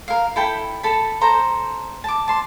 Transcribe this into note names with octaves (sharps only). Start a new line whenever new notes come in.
A#4 F5
E4 A4 G5 B5
A4 A5 B5
A4 C5 A#5
A5 D6
A5 C6